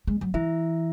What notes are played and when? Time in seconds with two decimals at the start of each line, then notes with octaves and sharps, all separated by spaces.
0.07 G#3
0.21 F#3
0.34 E3 E4 E5